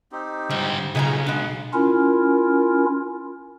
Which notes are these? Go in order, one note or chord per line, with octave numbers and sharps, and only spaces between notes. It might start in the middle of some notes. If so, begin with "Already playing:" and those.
C4 D#4 G4
G#2 D3 G3
B1 A#2 C#3 G#3 D#4 A#5
G#3 B3 D4 F#5
C#4 E4 F4 A#4